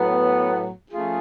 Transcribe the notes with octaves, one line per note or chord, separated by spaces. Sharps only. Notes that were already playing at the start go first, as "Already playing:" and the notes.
Already playing: A2 F#3 B3
F3 A3 C#4 F4 G#4